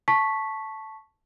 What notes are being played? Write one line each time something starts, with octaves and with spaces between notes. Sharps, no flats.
A5 C#6 B6